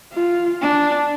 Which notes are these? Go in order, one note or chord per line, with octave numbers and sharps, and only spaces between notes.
F4
D4